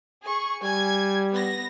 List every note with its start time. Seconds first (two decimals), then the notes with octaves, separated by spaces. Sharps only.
0.24 G#4 C#6
0.64 G3 G#5 G#6
1.32 B3 A#6